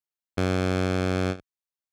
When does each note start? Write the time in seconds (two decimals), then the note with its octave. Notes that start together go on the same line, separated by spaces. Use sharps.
0.37 F#2